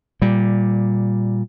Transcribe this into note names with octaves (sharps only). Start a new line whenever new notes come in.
A#2 G3